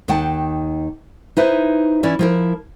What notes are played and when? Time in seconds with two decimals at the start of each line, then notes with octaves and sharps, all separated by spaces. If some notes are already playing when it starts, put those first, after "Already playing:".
0.08 D#2 D#3 F#5 G5 A5
1.37 D#4 E4 B4 C5
2.03 E3 C#4 E4 D5
2.19 F3 E4 A#4